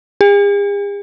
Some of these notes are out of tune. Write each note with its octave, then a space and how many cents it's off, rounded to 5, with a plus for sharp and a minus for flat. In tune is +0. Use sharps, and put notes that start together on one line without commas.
G#4 -45